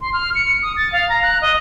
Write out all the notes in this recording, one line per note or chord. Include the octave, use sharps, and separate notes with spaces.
C6
F6
C#7
D#6
A6
F5
A#5
F#6
D#5